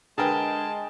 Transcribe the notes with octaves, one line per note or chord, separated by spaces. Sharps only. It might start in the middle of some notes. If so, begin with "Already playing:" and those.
D3 G#3 G#4 A#4 B4 G5 A5